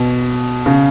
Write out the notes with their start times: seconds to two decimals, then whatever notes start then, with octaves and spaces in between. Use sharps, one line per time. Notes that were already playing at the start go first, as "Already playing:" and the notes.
Already playing: B2
0.66 C#3